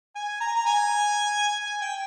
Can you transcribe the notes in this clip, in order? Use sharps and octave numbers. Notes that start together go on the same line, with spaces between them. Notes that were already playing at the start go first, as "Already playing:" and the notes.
G#5
A#5
A#5
G#5
G#5
G5